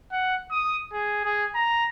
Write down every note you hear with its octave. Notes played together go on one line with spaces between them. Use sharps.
F#5
D#6
G#4
G#4
A#5